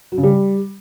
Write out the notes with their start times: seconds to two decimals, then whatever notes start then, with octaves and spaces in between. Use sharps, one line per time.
0.12 F#3
0.18 C#3
0.23 G3